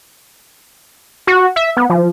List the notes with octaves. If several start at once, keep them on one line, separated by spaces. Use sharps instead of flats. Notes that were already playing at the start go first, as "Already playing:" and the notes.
F#4
E5
B3
F3